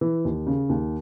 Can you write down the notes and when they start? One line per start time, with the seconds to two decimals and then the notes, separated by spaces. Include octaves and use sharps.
0.01 E3
0.25 D#2
0.47 C#3
0.69 D#2